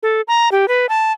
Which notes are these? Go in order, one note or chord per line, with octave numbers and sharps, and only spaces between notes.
A4
A#5
G4
B4
A5